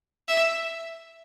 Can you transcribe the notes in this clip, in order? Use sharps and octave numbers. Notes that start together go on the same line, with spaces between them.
E5